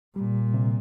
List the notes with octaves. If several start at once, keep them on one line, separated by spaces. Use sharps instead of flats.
A#2 G3
C3